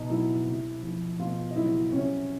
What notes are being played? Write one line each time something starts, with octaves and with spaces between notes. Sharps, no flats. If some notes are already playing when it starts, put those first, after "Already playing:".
Already playing: B2 D#4 D#5
F#3 E4 E5
C3
F3
B2 F4 F5
D#5
F#3 E4 E5
C3 C#4 C#5